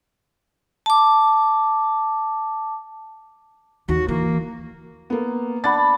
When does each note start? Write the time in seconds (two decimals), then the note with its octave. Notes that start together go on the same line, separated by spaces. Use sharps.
0.86 A5 D6
3.88 D#2 F#4
4.09 E3 A#3
5.10 A#3 B3
5.64 D4 F#5 B5 A6